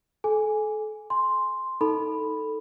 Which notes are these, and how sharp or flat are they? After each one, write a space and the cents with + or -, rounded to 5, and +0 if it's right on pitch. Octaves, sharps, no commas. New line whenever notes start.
A4 -35 G#5 +0
G#5 +0 C6 +0
D#4 +25 A4 +5 B5 +0